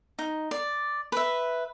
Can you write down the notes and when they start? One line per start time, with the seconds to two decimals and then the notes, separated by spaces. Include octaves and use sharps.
0.19 D#4
0.51 D5
1.12 B4 E5